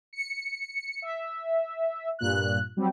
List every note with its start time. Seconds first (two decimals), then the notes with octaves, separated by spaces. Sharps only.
0.13 C#7
1.02 E5
2.19 G2 A#2 F#6
2.76 F#3 G3 C4